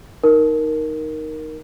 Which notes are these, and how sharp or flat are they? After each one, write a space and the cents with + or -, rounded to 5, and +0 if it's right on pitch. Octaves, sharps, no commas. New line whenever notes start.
D#4 +0 A#4 +0